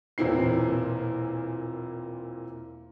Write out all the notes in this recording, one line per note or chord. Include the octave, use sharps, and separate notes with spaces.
E1 A#2 E3 C4 E4 C7